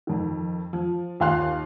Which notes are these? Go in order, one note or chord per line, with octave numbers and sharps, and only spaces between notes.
F2 D#3
F3
D#2 F4 F5 C6 F#6 F7